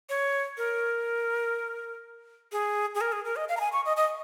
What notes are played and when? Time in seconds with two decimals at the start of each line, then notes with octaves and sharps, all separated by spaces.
0.09 C#5
0.57 A#4
2.52 G#4
2.95 G#4
3.01 A#4
3.12 G#4
3.25 A#4
3.36 D#5
3.49 F5
3.57 A#5
3.60 G#5
3.73 C#6
3.86 D#5
3.97 D#5